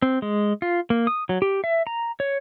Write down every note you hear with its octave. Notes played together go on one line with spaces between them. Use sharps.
C4
G#3
F4
A#3
D#6
F#3
G4
E5
A#5
C#5